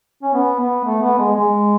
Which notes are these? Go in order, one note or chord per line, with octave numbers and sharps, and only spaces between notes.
C#4
B3
B3
A3
B3
G#3
G#3